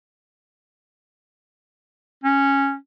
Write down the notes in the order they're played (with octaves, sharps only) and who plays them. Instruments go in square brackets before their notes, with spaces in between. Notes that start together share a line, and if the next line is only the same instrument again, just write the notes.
[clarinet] C#4